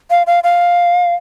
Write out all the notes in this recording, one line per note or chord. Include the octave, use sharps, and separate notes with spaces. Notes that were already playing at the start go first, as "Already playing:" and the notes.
F5
F5
F5